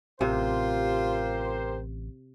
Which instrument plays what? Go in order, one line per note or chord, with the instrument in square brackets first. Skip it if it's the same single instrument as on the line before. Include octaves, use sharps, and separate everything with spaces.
[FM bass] A1 [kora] C3 [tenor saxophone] F4 [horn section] G4 A#4 C5